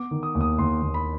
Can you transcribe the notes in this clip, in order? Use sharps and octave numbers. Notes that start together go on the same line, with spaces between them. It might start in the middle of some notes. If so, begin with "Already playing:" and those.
Already playing: B3 D6
D#3
D#6
D#2
D#6
D#2 C6
D#2
B5